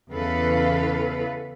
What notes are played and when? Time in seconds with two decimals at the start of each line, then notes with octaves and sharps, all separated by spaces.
0.11 E2 C#3 E3 A4 B4 F5